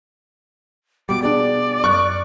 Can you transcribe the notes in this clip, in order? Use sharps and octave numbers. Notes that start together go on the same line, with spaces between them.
B2 G3 D6
D4 F#4 G#4 D5
F#2 C#6 F6 F#6